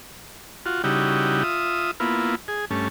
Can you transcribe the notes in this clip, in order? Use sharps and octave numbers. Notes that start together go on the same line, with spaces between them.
F4 F#4
C#3 G3 D#4 E4 F#4 G4
F4 E5 D#6
A#3 B3 E4 F4
G#4
G2 A3 C#4